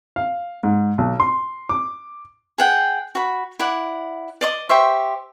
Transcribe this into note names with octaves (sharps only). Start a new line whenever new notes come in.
F5
G#2
B1
C6
D6
G#4 F#5 G5
F#4 B5
E4 D5 F#5
D5 D#5 D6 D#6
G4 C5 E5 C#6